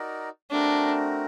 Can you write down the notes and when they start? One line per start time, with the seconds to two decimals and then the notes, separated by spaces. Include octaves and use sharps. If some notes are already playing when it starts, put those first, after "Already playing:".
Already playing: D#4 F#4 A#4 D5
0.51 A3 C4 D4 F#4 A#4